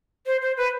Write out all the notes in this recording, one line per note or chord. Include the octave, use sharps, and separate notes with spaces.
C5
C5
B4